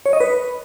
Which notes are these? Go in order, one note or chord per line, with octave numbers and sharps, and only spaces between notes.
C#5
D#5
B4